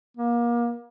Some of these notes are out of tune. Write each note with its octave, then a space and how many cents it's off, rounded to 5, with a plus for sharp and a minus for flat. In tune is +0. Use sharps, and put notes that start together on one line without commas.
A#3 +30